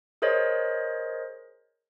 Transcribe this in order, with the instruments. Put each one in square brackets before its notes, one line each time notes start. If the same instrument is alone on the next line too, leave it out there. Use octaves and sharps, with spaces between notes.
[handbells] G#4 A#4 C5 C#5 D#5